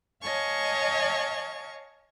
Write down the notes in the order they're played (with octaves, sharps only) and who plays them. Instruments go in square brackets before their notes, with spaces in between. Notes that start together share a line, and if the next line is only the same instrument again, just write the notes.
[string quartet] C#5 D#5 F5 G#5 A5 C#6